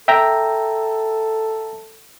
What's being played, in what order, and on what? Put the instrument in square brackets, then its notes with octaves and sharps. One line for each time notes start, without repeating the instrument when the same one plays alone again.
[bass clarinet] A4 [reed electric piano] E5 G5 A#5